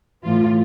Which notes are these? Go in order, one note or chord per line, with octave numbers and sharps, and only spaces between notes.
A2 E3 F4